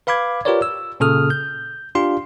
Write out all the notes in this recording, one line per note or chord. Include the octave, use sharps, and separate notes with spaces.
B4 F5 B5 D6 G#6
F4 G4 A#4 B4 C#5 D5
E6
A#2 C#3 A4 D#6 F6
G6
D4 F4 G4 F5 C6